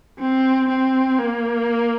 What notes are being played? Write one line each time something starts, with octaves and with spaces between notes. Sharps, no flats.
C4
C4
A#3